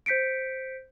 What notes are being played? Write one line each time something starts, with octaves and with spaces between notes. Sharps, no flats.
C5 G6 B6 C#7 D7